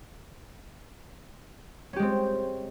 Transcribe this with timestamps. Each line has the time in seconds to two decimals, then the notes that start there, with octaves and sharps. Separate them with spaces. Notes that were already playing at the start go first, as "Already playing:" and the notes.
1.93 C#4
1.96 G4
1.99 G#3
2.02 C4